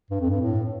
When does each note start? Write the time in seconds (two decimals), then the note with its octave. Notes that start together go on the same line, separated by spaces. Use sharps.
0.10 G2
0.21 F2
0.31 G2
0.41 A2